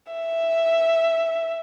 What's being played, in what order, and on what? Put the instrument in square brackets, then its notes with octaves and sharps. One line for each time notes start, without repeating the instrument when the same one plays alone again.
[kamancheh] E5